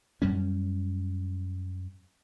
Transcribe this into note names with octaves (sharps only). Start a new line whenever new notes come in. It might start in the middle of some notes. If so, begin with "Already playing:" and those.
F#2 G3 C#4